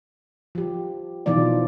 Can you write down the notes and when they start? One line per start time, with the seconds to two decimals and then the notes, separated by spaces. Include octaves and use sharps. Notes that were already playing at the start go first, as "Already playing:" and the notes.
0.55 F3 G4
1.26 B2 E3 F3 D#4 F4 D5